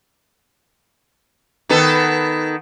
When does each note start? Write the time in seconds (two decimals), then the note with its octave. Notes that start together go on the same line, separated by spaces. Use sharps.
1.69 D#3 B3 A4